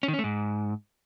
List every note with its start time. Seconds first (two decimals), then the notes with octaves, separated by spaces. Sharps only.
0.03 C#4
0.08 D#3
0.13 C#4
0.19 A3
0.24 G#2